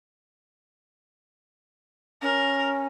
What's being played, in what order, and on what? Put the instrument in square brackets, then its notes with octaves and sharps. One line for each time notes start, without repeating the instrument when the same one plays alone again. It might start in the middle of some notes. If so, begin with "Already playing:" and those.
[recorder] C#4 [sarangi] A#4